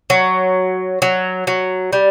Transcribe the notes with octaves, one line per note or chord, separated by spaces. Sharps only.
F#3
F#3
F#3
G3